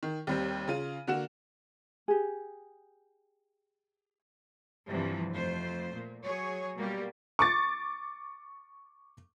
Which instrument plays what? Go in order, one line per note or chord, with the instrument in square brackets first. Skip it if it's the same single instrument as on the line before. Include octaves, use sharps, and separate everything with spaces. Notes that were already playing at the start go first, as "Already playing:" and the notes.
[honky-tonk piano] D#3
D#2 G3 C4
C#3 F4 D#7
D3 A#3 F#4 F#5 E7
[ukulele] G4 G#4
[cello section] G2 C3 E3 F3
F2 A3 C5
A#2
F#3 G#4 C#5
B2 G3 A#3 G4
[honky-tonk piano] C#6 D6 A6